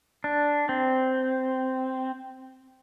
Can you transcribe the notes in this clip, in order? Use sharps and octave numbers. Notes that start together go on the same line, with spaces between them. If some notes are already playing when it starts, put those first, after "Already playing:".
D4
C4